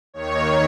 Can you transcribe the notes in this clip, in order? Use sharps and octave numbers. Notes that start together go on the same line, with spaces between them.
D#2 D#3 C#5